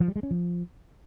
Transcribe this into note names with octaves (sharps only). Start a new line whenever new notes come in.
F3
G3
G#3
C#4
F3